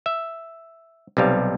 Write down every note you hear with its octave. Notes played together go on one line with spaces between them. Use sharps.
E5
B1 C3 G3 F5